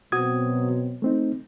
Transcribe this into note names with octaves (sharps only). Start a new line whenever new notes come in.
B2 F#3 C4 F#4 D#6 G#6
A3 C4 D#4